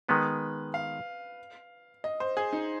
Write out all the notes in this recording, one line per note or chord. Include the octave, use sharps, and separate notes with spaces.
D#3 G#3 B3 B4
F5
D#5
C5
G#4
D#4